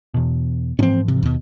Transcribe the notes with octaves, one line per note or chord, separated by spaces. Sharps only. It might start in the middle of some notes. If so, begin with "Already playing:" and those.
E2 B2
G#2 E3 F3 C4 C#4
C3
D#2 B2